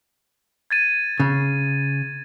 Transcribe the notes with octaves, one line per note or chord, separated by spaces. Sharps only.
G#6 A6 D#7
C#3